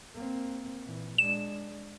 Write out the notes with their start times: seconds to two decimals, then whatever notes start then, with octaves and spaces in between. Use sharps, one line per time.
0.14 A#3 C4
0.85 A#2 E3
1.18 G#3 D4 E7